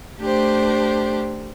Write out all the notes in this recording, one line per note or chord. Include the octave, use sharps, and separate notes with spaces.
A3 D4 G4 C5